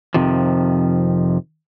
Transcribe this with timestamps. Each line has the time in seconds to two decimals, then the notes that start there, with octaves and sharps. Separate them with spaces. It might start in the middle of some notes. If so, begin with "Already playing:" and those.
0.14 F2 C3 D#3 F3